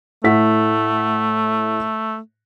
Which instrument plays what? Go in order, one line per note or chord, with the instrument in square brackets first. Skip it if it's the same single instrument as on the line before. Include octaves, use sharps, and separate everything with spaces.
[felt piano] A2 F#5 B6 [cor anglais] A3